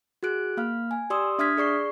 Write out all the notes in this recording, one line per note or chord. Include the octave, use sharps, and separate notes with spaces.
F#4 G#4 F#6 D7
A#3 F5 F6
G#5
G4 D5 C6 D#6 E6
D4 E5 D#6 F6 G#6 B6
G#4 D5 C#6 C7